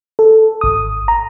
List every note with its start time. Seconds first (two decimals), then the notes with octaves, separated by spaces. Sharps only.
0.19 A4
0.61 G#1 D#6
1.08 A#5